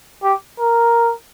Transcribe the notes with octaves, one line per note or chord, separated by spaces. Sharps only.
G4
A#4